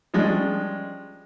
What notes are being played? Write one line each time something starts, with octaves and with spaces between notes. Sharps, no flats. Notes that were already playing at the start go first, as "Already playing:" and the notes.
F3 G3 G#3 C#4 D4